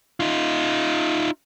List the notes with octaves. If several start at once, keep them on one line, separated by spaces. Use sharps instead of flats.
D#4 F4